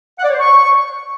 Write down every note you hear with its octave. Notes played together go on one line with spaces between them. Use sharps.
F#5
D5
C#5
C5
C#6